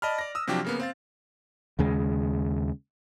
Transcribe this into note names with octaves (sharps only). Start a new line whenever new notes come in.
D5 D#5 A5 B5 F6
D5 A#6
D#6 E6
C3 F3 F#3 D4 G4 G5
C#3 A#3 B3
C4 F5 A6
D#2 C#3 G#3